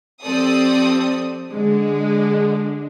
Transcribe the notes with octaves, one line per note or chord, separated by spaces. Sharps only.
F3 C4 G4 A4 D5 D#6
D3 G#3 D4